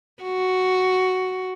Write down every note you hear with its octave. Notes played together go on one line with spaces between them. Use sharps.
F#4